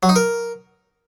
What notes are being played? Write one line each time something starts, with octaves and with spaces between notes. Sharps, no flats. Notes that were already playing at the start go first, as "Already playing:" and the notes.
F#3
D#4
A#4